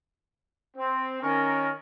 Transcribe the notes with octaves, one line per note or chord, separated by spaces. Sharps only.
C4
D#3 C#4 A#4